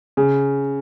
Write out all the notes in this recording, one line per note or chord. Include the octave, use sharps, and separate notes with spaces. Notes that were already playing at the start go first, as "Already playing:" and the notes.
C#3